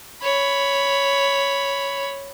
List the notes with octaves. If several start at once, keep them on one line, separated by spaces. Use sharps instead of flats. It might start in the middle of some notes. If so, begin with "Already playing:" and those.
C#5 B5